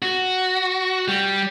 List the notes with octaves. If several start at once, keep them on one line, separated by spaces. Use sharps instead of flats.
F#4
G3